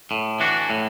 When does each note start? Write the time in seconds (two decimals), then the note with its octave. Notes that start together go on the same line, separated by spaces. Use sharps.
0.11 A2
0.40 E3 D4 F#4
0.70 A2